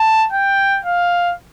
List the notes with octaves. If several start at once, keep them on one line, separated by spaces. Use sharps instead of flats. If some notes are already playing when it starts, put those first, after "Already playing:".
Already playing: A5
G5
F5